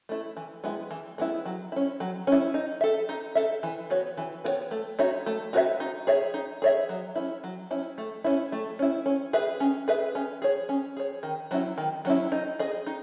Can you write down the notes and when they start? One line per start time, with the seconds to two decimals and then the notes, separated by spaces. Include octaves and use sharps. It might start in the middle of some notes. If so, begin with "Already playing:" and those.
0.09 A3 E4
0.37 E3
0.64 G#3 B3 E4
0.91 E3
1.18 G#3 B3 E4
1.45 F#3
1.72 C#4 E4
2.00 F#3
2.27 C#4 E4
2.54 D#4
2.81 A4 E5
3.09 D#4
3.35 A4 E5
3.63 E3
3.90 B3 F#4 C#5
4.17 E3
4.44 B3 F#4 C#5
4.71 A3
4.99 D#4 F#4 C#5 E5
5.26 A3
5.53 D#4 F#4 C#5 E5
5.80 D#4
6.07 G#4 C#5 E5
6.34 D#4
6.62 G#4 C#5 E5
6.89 F#3
7.15 C#4 E4
7.44 F#3
7.71 C#4 E4
7.98 A3
8.24 C#4 E4
8.52 A3
8.79 C#4 E4
9.06 C#4
9.33 G#4 B4 E5
9.60 C#4
9.88 G#4 B4 E5
10.15 C#4
10.42 G#4 C#5
10.69 C#4
10.97 G#4 C#5
11.23 D#3
11.51 F#3 C#4 E4
11.78 D#3
12.05 F#3 C#4 E4
12.32 D#4
12.59 G#4 D#5
12.86 D#4